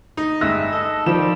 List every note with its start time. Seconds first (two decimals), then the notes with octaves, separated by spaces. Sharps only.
0.17 D#4
0.41 G2 G#3 D#4 E5 E6 F#6 A#6
0.72 A4 D#5
1.06 D#3 F3 G3 E7